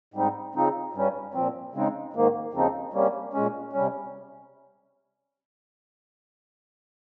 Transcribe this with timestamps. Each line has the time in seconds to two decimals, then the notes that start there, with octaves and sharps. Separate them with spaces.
0.14 G#2 G3 C4 D#4
0.55 C#3 F3 C4 D#4
0.94 G2 G3 C#4
1.34 A#2 F3 C4
1.74 C#3 G#3 C4 D#4
2.13 G#2 D#3 A#3
2.53 D#2 C#3 F3 C4 D#4
2.93 C3 G3 A#3 C#4
3.34 A#2 G#3 C#4
3.73 C3 G3 C#4